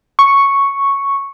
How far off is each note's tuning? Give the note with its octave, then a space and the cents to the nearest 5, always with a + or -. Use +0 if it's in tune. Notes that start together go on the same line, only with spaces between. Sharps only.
C#6 +0